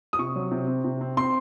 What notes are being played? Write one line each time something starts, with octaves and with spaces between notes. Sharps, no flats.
D#6
C3 C#6
F#3
C3
C4
C3
C4
C4 C6